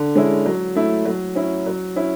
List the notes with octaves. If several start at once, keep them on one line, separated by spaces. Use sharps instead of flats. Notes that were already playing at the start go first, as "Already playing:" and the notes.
Already playing: D3
G#3 C#4 E4
F#3
A3 E4
F#3
C#4 E4
F#3
C#4 E4